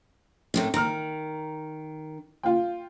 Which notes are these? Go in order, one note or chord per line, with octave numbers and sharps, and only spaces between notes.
A2 C3 D#3
D#3 A#5 F6
F4 G5